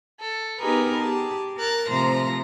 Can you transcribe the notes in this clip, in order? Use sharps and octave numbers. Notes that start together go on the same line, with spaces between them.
A4
B3 D#4 G4 G#4 A#4 B4
G4 G#4 A5
A#4 F#6 A6
C3 F3 A3 C5 A#5 A#6